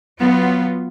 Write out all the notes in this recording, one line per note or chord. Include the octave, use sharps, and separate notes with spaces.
F#3 B3 F4